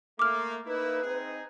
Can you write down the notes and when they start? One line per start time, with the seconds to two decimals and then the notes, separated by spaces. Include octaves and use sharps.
0.19 A3 A#3 D6 F6
0.66 A#3 D#4 E4 B4
1.03 C4 D#4 G#4